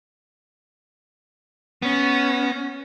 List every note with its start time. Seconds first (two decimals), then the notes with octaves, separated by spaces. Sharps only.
1.82 B3 C#4